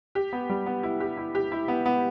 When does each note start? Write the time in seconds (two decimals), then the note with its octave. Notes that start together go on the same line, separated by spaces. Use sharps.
0.15 G4
0.33 B3
0.50 G3
0.66 B3
0.83 E4
1.00 G4
1.17 E4
1.35 G4
1.52 E4
1.68 B3
1.86 B3